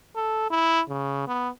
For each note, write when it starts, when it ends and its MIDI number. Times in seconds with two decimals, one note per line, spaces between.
0.16 0.50 69
0.51 0.81 64
0.89 1.26 49
1.28 1.49 59